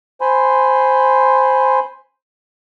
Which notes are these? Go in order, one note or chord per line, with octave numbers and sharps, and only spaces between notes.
C5 G#5 B5 C6